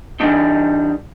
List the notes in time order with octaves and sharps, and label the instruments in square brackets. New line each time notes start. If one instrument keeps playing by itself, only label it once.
[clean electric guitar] E3 G3 A3 D4 D#4